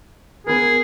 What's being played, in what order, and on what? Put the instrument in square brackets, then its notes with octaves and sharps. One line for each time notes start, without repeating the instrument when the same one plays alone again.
[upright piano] B3 A#4 [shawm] G#4